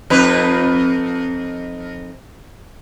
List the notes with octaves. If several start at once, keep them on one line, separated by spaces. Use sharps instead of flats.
F2 D#4 B4